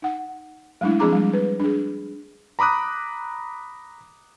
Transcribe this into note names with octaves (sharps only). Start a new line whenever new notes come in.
D#4 F#5
F#3 G#3 A3 D4 E4
F3 C4 D4 G#4 A#5 D6
G3 G#3
B4
D4 G#4
A#5 B5 D6 D#6 F#6